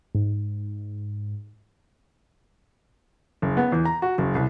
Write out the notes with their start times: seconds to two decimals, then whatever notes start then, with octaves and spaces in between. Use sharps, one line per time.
0.15 G#2
3.42 F#1
3.57 B3
3.72 E2
3.85 A#5
4.02 F#4
4.18 F#1
4.35 C2